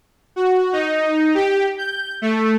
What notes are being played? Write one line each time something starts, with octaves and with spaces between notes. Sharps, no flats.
F#4
D#4
G4
G6
A3